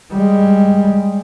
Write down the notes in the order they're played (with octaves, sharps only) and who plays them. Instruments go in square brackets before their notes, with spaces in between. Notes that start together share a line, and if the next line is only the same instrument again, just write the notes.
[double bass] G3 G#3